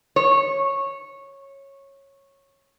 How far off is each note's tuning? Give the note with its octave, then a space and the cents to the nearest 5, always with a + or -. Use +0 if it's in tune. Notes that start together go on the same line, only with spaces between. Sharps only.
C#5 -15